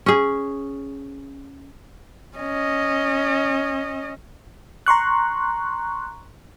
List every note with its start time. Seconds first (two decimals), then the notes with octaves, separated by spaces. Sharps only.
0.06 C#4 G#4
2.38 C#4 D#5
4.86 A#5 C6 C#6 F#6